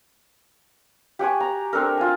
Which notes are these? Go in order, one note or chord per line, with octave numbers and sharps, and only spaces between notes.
G4 F#5 G#5 C#6
A#5
C4 D4 A4 A#4
F4 G#5